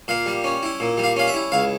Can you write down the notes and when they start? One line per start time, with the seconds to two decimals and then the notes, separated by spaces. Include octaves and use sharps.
0.08 A#2 F5
0.26 G3
0.44 C#4
0.63 E4
0.80 A#2
0.97 G3
1.04 F5
1.16 C#4 F5
1.27 E5
1.34 E4
1.52 C#2 F5